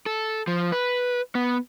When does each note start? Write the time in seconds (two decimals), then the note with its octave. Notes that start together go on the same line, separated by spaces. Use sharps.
0.06 A4
0.47 F3
0.72 B4
1.35 B3